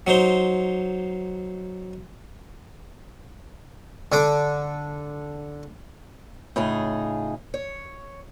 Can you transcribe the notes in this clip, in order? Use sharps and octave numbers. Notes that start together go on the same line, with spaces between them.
F#3 D#4 C5 C6
D3 D4 D6
A2 C#3 D#4 F4 G#4
C#5